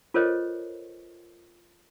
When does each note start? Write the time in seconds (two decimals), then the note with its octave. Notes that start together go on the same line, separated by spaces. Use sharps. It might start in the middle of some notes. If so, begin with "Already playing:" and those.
0.14 F4 A4 A#4 C5 C#5 D#5